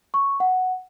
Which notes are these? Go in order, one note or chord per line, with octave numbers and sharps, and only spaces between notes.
C#6
F#5